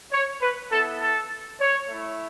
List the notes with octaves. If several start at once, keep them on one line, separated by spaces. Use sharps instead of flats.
C#5
B4
B3 E4 A4
A4
C#5
A3 E4